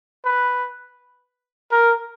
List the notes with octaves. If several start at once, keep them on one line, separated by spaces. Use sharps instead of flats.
B4
A#4